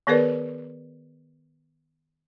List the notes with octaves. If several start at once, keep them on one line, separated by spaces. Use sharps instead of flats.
D#3 B3 G#4 A#4 B4 D5